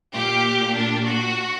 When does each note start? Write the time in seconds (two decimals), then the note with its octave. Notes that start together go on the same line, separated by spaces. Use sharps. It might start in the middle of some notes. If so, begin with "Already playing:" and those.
0.13 A#2 G4
0.75 D4
1.05 F#4